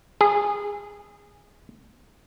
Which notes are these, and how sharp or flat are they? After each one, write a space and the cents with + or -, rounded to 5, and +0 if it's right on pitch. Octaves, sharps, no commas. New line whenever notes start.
G#4 -20